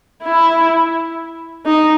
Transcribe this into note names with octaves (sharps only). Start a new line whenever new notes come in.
E4
D#4